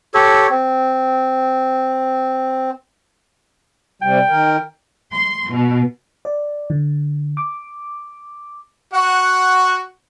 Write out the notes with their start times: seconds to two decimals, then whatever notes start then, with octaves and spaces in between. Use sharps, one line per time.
0.14 G4 A4 C#5
0.50 C4
4.02 C3 G3 G5
4.29 D#3 A#4
5.13 C6
5.52 B2
6.25 D5
6.70 D3
7.37 D6
8.94 F#4 F#5